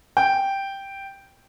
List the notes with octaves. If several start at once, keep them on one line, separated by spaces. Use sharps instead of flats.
G5